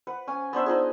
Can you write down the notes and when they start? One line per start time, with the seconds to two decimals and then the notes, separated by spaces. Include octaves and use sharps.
0.07 B4 F#5
0.28 C#4 G#5
0.53 B3 D4 C5 E5
0.66 D#4 F4 G#4